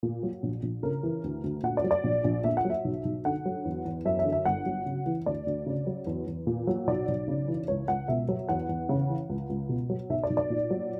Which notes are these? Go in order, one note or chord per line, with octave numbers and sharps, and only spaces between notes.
A#2
F#3
A#1
A#1
C#3 A#4
E3
D2
D2
A#2 F#5
D5
F#3
D5
A#1
A#1
A#2 E5
F#5
F#3 E5
B1
B1
D3 F#5
F#3
E2
E2
F#2 E5
E5
D3
E5
G1 F#5
F#3
C#3
E3
D2 D5
D2
C#3
F#3
E2
E2
A#2
F#3
B1 D5
B1
C#3
E3
C#2 C#5
C#2 F#5
B2 E5
F#3
E2 F#5
E2
C#3
E3
C#2
C#2
B2
F#3
B1 E5
D5
B1
D5
A#2
F#3